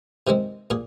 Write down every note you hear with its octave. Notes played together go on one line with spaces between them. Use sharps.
C3 D#3 G#3 C4
A#2 G#4